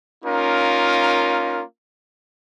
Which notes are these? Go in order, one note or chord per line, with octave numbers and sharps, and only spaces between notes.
A#3 C#4 D#4 F4 A#4